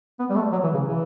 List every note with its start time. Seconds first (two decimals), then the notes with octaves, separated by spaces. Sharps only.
0.19 B3
0.30 G3
0.36 A3
0.52 F#3
0.63 E3
0.74 C#3
0.85 E3